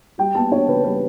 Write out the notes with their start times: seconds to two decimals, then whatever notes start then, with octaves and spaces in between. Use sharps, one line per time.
0.18 G3 G5
0.35 B3 A5
0.51 D4 C#5
0.68 C#3 B4
0.84 G3 B4